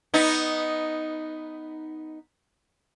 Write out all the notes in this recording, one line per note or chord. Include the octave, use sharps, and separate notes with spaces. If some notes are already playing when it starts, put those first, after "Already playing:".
B3 D#4